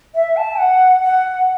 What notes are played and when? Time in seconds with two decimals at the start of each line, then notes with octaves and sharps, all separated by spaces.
0.15 E5
0.37 A5
0.59 F#5
1.03 F#5